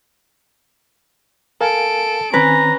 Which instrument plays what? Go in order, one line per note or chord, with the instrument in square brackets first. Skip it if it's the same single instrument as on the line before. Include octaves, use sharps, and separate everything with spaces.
[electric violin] A4 D7 [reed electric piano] A#4 F5 G#5
[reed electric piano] D#3 C4 G#5 [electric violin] C#4 [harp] B4 [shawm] A#5